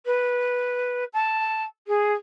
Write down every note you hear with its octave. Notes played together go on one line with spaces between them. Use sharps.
B4
A5
G#4